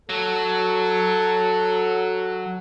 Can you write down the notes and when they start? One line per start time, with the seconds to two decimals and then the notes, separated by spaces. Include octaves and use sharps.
0.10 F#3 A4